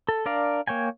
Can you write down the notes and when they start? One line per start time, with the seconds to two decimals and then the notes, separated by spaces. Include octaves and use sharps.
0.09 A4
0.26 D4 A#4 D5 F5
0.67 A#3 C#5 G5 G#5